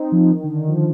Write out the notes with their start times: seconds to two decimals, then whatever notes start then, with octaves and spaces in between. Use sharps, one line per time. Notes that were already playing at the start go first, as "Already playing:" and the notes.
Already playing: C4 D#4
0.12 F3
0.30 D#3
0.43 D3
0.55 D#3
0.68 F3